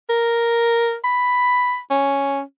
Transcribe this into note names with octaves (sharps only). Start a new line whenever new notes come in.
A#4
B5
C#4